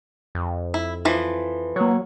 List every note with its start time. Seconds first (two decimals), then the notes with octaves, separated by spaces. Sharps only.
0.35 F2
0.74 E4
1.05 E3 F3
1.76 F#3 A#3 C#5